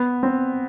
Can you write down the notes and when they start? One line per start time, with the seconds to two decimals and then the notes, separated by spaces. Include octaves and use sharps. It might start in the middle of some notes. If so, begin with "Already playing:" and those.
Already playing: B3
0.23 C4